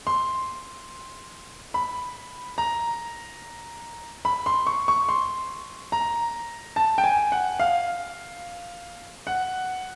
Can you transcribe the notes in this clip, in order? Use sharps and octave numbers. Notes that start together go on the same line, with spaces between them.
C6
B5
A#5
B5
C6
C#6
C#6
C6
A#5
A5
G5
G#5
F#5
F5
F#5